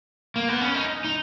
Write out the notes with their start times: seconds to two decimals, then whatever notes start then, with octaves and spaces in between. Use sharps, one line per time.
0.36 A#3
0.48 B3
0.61 C#4
0.75 D#4
1.05 D#4